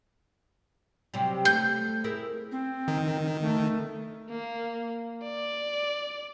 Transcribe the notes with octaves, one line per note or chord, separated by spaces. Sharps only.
C3 F#3 G3
A3 G6
E4 G#4 A#4
C4
D#3
A3
A#3
D5